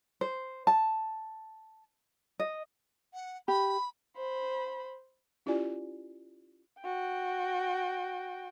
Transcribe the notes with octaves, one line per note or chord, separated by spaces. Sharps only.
C5
A5
D#5
F#5
G4 B5
C5 B5
C#4 E4 F4 G4 D5 G#5
F#4 G5